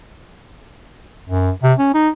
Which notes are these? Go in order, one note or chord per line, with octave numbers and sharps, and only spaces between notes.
F#2
C3
C#4
D#4